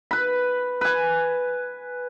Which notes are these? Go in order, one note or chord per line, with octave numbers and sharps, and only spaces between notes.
B4 B5
B4 G#5